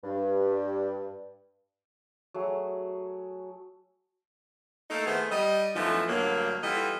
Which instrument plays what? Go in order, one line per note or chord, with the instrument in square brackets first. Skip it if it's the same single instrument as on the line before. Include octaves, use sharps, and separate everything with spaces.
[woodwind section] G2
[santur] F#3 A3 G#4
[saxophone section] A3 A#3 D#4 A4 A#4
D#3 A3 B3 E4 G#4 C5
G3 D#5
F#2 E3 F3 A3 B3 D#4
D2 G2 F#3 A#3
E3 G3 B3 F4 A4 D#5